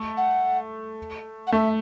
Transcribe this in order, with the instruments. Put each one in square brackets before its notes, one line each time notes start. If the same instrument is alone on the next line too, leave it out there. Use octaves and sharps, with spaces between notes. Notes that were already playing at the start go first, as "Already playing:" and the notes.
Already playing: [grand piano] A3
[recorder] F#5
F#5
[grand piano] A3 [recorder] E5